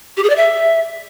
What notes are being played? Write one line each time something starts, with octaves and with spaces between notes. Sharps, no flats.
G4
G#4
D5
E5